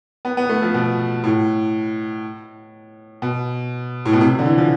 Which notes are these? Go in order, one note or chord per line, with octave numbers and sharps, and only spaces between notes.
B3
B3
A3
F3
B2
A2
B2
A2
B2
C3
D3
E3
F3